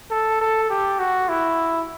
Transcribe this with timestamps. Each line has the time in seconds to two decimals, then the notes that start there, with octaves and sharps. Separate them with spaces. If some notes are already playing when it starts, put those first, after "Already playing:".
0.11 A4
0.41 A4
0.70 G4
0.99 F#4
1.29 E4